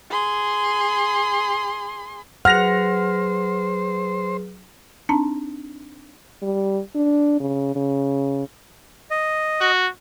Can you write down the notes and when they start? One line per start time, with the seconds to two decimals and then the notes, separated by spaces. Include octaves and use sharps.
0.11 G#4 C6
2.45 F#3 G#4 B4 C5 F#5 F6 A#6 F7
5.09 C4 D4 D#4 A5 A#5
6.42 G3
6.95 D4
7.40 C#3
7.75 C#3
9.11 D#5
9.61 F#4